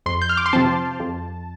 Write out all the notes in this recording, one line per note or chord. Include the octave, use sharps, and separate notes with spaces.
F2 C6
G6
F6
D6
C6
C3 F3 C4 A5
F2